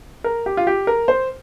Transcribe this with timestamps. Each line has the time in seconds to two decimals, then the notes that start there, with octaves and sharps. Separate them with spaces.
0.24 A#4
0.46 G4
0.57 F4
0.67 G4
0.87 A#4
1.08 C5